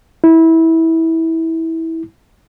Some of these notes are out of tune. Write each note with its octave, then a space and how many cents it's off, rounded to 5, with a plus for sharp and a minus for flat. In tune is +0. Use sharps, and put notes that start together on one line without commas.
E4 -20